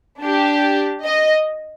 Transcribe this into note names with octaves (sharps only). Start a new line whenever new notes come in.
D4 G4
D#5